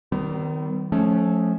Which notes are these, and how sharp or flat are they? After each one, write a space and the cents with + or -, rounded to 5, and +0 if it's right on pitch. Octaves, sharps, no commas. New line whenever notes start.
D#3 +0 G3 -35 B3 +45
F3 +15 A3 -20 C#4 +0